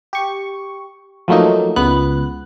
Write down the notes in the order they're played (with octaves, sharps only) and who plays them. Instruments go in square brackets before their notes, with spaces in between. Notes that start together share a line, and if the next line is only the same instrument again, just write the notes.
[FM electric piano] G4 C#6
F3 F#3 A3 A#3 D#4
C#2 B3 F#6